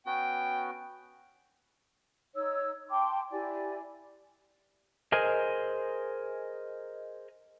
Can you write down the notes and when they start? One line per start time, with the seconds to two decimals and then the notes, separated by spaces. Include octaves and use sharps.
0.06 B3 C#4 F#4 G5
2.35 D#4 C#5 E6
2.90 G5 A5 C6 D6
3.31 E4 G4 D5 G#5
5.12 G#4 A#4 C5 D#5 G#5